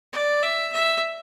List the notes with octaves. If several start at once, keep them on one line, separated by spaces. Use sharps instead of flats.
D5
E5
E5